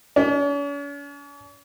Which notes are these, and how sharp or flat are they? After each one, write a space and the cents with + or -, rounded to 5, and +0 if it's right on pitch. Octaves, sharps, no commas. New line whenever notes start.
C#4 +45